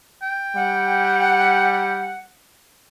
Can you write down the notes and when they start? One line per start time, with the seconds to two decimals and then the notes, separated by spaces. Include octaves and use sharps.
0.22 G5
0.56 G3 F#5